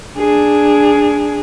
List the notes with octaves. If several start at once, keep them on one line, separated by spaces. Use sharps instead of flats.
D4 G#4